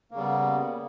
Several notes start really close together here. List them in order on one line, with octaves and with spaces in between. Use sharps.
A#3 C#3 G3 B3